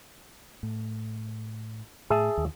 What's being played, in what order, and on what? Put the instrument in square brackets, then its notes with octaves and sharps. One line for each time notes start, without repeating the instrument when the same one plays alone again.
[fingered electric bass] A2
[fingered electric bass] A2 [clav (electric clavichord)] G#4 E5 A5
[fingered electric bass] D#2